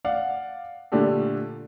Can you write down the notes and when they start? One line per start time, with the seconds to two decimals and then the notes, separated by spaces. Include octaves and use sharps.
0.05 D5 F5 F#5
0.92 A#2 D3 A3 D4 G4 A4